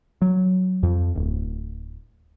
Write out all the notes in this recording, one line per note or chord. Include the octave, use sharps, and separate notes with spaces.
F#3
F2
D1